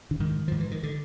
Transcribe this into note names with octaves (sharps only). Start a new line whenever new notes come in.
D3
G#2 D#3
G#2 F3
E3
D#3
D3